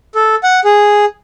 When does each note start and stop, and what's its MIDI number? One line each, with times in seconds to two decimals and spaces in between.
0.15 0.35 69
0.43 0.60 78
0.65 1.05 68